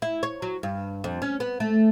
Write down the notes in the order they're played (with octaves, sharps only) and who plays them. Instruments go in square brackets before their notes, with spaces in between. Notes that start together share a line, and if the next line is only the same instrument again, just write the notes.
[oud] E4
C#5
F#3
G2
F2
C#4
B3
A3